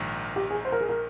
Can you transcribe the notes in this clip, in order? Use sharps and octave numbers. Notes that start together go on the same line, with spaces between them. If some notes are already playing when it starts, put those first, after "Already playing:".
Already playing: A#1 G#2 D#3
G4
G#4
C5
A#4
G#4
A#4